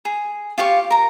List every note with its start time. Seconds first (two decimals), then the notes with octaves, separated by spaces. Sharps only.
0.05 G#4
0.58 F4 G4 F5 C#6
0.90 A#4 A#5